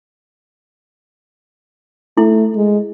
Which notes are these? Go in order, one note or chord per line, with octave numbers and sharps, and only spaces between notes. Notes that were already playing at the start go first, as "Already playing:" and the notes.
A3 E4
G#3